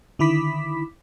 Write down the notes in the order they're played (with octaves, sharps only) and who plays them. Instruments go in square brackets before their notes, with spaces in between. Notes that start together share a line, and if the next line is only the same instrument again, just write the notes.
[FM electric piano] D3 D#3 E4 B5 D6 B6